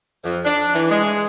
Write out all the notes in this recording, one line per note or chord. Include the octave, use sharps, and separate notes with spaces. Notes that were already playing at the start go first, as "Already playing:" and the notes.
F2
D4
E3
G#3